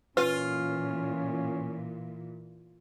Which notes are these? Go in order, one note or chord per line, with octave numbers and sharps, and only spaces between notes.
A#2 E3 C#4 F4 B4